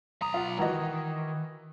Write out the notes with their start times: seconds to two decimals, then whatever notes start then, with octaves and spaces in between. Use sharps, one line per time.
0.22 B1 A#5 D#6
0.34 F4 F#5
0.59 D#3 E3 F#4 D#5